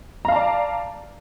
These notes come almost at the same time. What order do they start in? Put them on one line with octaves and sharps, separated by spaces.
A#5 F5 A5 D5